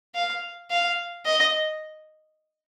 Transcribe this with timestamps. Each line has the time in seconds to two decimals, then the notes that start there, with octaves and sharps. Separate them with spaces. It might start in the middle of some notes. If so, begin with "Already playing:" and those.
0.15 F5
0.71 F5
1.26 D#5